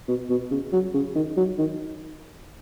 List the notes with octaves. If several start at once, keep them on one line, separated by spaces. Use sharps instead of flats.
B2
B2
C#3
F#3
C#3
D#3
F#3
D#3